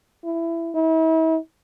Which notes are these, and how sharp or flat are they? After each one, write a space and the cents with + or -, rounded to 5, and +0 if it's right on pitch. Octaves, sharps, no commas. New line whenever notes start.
E4 +15
E4 -40